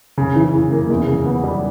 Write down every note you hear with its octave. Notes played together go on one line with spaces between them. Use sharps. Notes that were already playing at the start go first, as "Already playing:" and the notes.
C#3
E3
C#3
A#3
E2
C#3
B3
G3